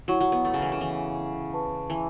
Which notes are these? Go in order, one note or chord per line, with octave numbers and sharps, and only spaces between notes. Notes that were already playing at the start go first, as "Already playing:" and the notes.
F#3 E4 C#5 F#5 C#6
F#3
B3
A3
C#3
E3
C#3
E3
B4 A5 C#6
E3